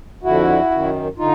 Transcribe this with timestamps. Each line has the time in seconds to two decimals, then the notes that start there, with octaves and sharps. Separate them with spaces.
0.22 F2 D3 E4 F#4
0.71 F#2 D#3
1.17 D3 D#4 F4